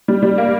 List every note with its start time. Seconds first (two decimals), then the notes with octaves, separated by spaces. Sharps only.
0.08 G3
0.23 G3
0.38 A#3